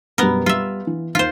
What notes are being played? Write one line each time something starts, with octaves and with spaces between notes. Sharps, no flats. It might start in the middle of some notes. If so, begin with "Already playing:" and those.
F#2 B2 G3 B3 A#4
G3 F4 E5
E3
D#2 D#3 F4 C5